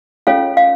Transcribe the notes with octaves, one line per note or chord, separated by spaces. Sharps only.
C#4 F4 A4 C#5 F5
F5